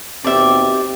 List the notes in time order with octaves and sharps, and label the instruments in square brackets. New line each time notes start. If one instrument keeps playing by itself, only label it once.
[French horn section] D#2 B2 C4 [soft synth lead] G4 [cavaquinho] D5 E5